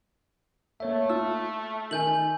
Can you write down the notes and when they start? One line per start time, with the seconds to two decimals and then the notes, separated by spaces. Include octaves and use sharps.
0.80 A3 A#3 C#5 E5
1.10 F4 E6
1.91 D#3 G#5 G6 F#7